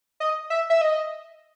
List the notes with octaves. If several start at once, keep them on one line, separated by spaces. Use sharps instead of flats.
D#5
E5
E5
D#5